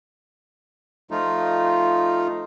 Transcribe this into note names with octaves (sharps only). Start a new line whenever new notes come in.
F3 A3 D#4 F4